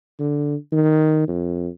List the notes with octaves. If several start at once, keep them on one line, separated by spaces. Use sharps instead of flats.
D3
D#3
F2